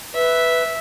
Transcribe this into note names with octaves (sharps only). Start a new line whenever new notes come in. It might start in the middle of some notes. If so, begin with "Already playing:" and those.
B4 E5